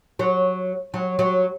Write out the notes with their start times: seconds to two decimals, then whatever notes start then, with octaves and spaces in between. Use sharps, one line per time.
0.19 F#3
0.94 F#3
1.19 F#3